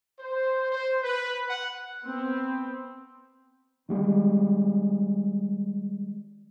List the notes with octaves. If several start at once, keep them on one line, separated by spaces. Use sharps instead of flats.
C5
C5
B4
F#5
B3 C4
D#3 G3 G#3